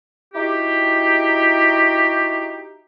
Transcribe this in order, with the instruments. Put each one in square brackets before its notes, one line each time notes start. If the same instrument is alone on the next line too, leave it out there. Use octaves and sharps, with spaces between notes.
[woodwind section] D#4 E4 F#4 G4